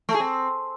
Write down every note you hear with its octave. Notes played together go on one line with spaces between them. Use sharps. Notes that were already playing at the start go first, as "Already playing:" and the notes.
A3
G#4
C4